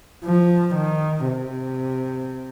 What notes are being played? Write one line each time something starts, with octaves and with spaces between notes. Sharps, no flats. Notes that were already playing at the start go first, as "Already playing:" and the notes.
F3
D#3
C3